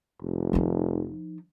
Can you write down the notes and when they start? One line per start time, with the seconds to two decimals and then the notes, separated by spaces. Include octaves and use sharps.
0.22 F1
0.53 F3 D#4